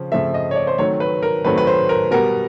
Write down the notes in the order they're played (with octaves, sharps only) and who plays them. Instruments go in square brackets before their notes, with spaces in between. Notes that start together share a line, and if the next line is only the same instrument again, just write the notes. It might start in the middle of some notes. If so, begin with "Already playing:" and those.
Already playing: [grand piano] C#3 F3 C4
C#3 F3 A3 C4 E5
D#5
C#5
D5
C5
D#3 F#3 A3 C4 C#5
B4
A#4
D#3 F#3 A3 C4 B4
B4
C5
A#4
B2 G3 B3 A#4